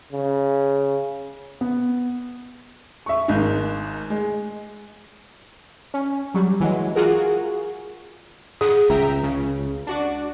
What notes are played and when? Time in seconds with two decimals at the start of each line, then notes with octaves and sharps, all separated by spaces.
0.12 C#3
1.61 B3
3.06 E5 C#6
3.28 G#1 G#2 D#4
4.10 G#3
5.94 C#4
6.34 F#3 G3
6.60 E3 F#3 G#3
6.95 F4 F#4 G#4 A#4
8.61 G#4 F#5 D#6
8.90 C#2 E5 G5 A#5
9.23 C#3
9.87 D4 F#4 D5